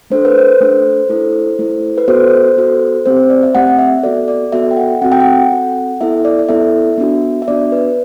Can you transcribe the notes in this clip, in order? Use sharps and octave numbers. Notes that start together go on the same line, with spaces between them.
A3 D4 A4 C5
B4
C5
A3 D4 A4
A3 E4 A4
A3 E4 A4
B4
B3 F#4 A4 C5
B3 F#4 A4
A3 C4 G4 C5
D5
E5
A3 C4 G4 F#5
E5
B3 F#4 A4 D5
D5
B3 F#4 A4 E5
G5
F#5
C4 F#4 A4 F#5
G5
F#5
C4 F#4 A4
B3 E4 A4 E5
D5
D5
B3 E4 A4 E5
B3 D4 F#4
E5
B3 D4 F#4 D5
B4